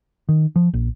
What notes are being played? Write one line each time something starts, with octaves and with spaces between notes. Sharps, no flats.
D#3
F3
A#1